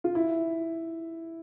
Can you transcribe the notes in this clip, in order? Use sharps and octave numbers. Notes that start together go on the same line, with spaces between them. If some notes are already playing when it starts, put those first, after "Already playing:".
F4
E4